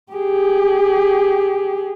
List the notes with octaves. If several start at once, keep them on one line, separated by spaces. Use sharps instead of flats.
G4 G#4